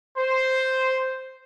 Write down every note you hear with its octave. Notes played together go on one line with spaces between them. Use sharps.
C5